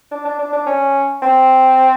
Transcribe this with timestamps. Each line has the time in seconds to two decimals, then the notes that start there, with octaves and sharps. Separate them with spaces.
0.11 D4
0.25 D4
0.39 D4
0.53 D4
0.66 C#4
1.22 C4